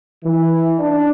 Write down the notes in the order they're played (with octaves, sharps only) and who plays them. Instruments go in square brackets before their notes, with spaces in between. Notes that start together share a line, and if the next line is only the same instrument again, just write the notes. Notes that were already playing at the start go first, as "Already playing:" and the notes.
[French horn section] E3
D4